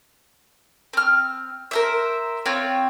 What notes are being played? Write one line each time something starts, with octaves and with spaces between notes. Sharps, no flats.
C4 F6
A#4 C5 E5
C4 F4 C#5 G5